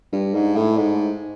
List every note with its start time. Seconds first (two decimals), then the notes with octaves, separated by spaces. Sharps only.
0.13 G2
0.34 G#2
0.56 A2
0.77 G#2